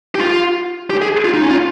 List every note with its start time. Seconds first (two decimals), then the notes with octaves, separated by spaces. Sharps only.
0.15 G4
0.21 F4
0.90 G4
1.02 G#4
1.25 F4
1.34 D#4
1.42 C#4
1.51 F4